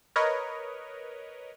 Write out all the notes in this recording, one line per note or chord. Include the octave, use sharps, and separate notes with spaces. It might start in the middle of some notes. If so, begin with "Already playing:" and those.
A#4 B4 C#5 D#5